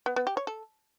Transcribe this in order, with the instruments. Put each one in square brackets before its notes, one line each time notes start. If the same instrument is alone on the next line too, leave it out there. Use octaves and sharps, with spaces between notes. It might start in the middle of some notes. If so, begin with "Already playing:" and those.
[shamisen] B3
B3
G4
C#5
A4